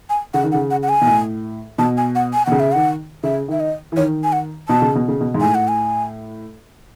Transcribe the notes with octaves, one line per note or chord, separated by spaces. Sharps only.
G#5
C#3 F#5
D#3
C#3 F#5
F#5
F#5
G#5
B2
A2
B2 A5
G#5
F#5
G#5
B2 F#5
C#3
E5
D#3 F#5
C#3 E5
D#3 E5
D#5
E3
D#3 C#5
G#5
F#5
B2 A5
C#3
B2
C#3
B2
G#2
A2 G#5
F#5
G#5